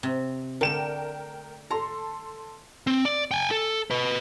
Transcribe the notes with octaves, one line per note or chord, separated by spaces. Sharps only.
C3
D3 A3 A#4 G5 E7
A4 A#5 C6
C4
D5
G5 G#5
A4
B4 D#5